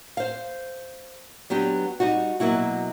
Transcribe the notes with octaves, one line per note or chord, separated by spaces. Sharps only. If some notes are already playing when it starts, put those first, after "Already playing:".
C5 F5
F#3 B3 D4 G4
G3 D#4 F#4
B2 F#3 A#3 E4 F#4